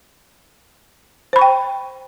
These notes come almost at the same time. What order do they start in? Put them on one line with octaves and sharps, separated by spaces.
C5 B5 C#6 G5